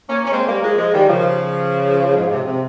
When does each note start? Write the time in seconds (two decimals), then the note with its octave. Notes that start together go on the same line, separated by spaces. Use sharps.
0.09 A#3 C#4
0.24 C#4
0.32 G#3 C4
0.47 G3 A#3
0.63 F3 G#3
0.78 F3 G#3
0.93 D#3 G3
1.08 C#3 F3
2.16 G#2
2.31 C3
2.46 C3